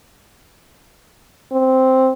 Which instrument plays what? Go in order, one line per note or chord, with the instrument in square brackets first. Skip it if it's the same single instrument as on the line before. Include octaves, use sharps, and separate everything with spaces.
[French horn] C4